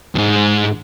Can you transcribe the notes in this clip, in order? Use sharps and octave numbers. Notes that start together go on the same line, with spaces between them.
D#2 G#2